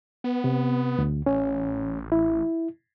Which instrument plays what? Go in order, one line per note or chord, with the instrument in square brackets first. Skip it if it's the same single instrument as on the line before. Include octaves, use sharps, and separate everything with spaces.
[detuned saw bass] B3
[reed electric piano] C3
D2
[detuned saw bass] A1 [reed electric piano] C#4
[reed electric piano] E4